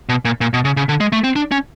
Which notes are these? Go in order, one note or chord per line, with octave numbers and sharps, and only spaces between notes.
B2
A#2
A#2
B2
C#3
C#3
D3
G#3
A3
C4
D4
C#4